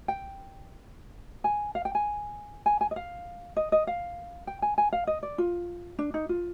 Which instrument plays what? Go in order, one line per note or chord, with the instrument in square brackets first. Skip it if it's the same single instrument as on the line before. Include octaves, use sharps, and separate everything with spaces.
[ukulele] G5
G#5
F5
G5
G#5
G#5
G#5
D#5
F5
D#5
D#5
F5
G5
G#5
G#5
F5
D#5
D5
F4
D4
D#4
F4